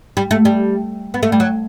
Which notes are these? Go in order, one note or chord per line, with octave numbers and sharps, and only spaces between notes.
G3
A3
G3
B3
A3
G3
F#3